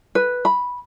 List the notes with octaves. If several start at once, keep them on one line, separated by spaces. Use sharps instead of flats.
B4
B5